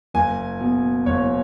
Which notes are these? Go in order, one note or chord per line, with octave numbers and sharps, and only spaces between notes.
F#1 G#5
B2
F#1 C#5